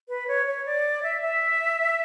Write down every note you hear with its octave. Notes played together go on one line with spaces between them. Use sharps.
B4
C#5
C#5
D5
E5
E5